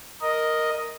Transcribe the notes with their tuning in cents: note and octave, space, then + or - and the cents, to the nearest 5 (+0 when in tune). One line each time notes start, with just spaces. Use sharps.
A#4 +0 D#5 +0